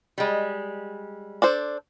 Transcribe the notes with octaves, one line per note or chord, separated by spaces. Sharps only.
G3 G#3
D4 A4 C5